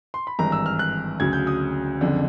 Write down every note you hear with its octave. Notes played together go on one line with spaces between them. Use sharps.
C6
B5
G#1 G2 E3 A#5
E6
F6
F#6
D2 C#3 F#3 G#6
G6
D#6
F#1 F2 D3